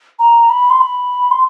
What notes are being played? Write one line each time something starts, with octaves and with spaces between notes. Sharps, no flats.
A#5
B5
C6
B5
C6